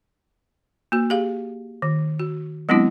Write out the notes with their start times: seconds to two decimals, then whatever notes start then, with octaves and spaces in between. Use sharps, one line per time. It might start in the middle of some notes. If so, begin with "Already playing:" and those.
0.92 A#3 F#4
1.10 G4 G#4 F5
1.82 D#3
2.19 F#4
2.69 F#3 G#3 B3 C4 D4 E4